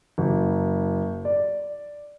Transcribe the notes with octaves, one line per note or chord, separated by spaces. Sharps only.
F#1
D5